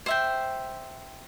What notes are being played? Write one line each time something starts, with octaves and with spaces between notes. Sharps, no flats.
C5 E5 G5